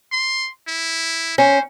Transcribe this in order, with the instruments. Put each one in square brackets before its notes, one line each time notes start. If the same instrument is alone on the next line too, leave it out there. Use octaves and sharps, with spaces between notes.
[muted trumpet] C6
E4
[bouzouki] C#4 [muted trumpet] C5